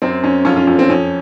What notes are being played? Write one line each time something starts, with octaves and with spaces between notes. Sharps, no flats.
F#2 C4
F#2 C#4
F2 C#4 F4
C#4 F4
F2 C#4
C4
F2 C#4